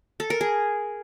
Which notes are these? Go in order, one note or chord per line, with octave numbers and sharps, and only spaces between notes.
A4
A#4
G#4